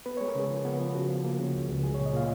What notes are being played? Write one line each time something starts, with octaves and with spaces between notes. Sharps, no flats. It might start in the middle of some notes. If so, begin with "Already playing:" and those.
B3 B4
G#3 C#5
A#4
C#3 G#4
F3
B3
F3
C#3 F#4
F3
A#3
C#3
C#2
C#2
F#3 G#4
A#2 C#5
D#5
A#2 F5